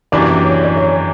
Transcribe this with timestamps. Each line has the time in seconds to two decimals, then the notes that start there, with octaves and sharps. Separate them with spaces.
0.12 F#2 E3 A#3 D4 G4 D5
0.45 C#5
0.64 D5
0.76 C#5